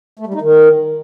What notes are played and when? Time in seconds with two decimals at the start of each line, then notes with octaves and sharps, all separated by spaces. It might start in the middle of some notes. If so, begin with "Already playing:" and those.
0.19 A3
0.27 G3
0.34 D#4
0.41 D#3